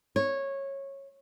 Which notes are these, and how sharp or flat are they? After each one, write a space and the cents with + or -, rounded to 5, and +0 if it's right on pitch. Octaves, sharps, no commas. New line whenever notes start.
C#5 -15